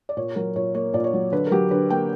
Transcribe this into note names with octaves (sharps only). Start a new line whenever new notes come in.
D5
A#2 C#5
F#3 A#4
A#2 C#5
A#3 C#5
A#2 D5
C#5
F#3
D3 B4
A#4
F#3 G4
D3 B4
A#3 G5